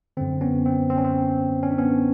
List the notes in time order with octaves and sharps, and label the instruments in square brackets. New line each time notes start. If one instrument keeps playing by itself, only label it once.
[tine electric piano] F#2 D3 C4
B3 C#4
C4
C4
C#4
C4
C#4
D4
B3 C#4